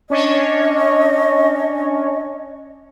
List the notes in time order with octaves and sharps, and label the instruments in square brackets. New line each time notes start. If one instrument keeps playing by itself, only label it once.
[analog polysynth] C#4 D4 C#5 [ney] D#5